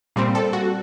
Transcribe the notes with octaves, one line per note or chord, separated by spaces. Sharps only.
A#2 G3 C4
A4
F#4